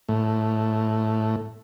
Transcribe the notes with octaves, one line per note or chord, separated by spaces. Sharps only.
A2